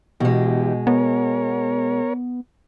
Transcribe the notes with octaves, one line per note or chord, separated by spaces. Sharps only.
B2 E3 G#3 G4
B3 A#4 C#5